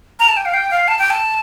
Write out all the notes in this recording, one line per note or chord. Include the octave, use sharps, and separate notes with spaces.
A#5
A5
G5
F5
G5
F5
A5
G5
A5